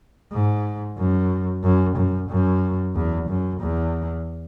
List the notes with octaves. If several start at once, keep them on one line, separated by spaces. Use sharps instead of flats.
G#2
F#2
F#2
F#2
F#2
E2
F#2
E2